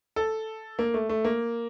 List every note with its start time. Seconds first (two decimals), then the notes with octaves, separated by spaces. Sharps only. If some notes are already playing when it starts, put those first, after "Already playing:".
0.16 A4
0.79 A#3
0.94 A3
1.09 A3
1.25 A#3